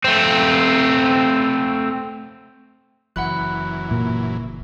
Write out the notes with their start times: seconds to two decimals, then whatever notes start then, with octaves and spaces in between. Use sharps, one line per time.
0.05 A3 C4
3.16 F#1 F#2 E3 F#5 B5 F#6
3.91 A#2